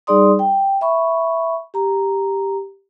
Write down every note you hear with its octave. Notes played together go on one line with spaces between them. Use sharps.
G3 D#4 G#4 D5 C6 D#6
G5
E5 B5 C#6
G4 A#5